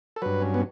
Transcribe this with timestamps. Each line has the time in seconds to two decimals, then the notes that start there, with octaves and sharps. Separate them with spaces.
0.16 A4
0.22 G2 F#3 B4
0.41 C#4
0.54 B3